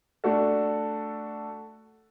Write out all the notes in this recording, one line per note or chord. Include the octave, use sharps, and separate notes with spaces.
A3 D4 F#4 A4